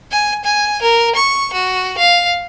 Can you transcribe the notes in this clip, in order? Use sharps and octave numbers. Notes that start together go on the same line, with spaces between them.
G#5
G#5
A#4
C#6
F#4
F5